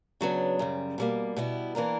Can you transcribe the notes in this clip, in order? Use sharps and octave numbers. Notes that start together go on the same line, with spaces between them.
C#3 F#3 B3 D4
F#2 C#3 G3
B2 G3 A#3
B2 G3 B3 E4
E3 A#3 D4 A#4